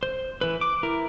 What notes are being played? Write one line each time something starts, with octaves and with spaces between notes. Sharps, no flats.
C5
E3 B4
D6
E4 A#4